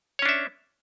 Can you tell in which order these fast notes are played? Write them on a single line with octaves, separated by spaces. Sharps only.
C#5 C#4 D4 E5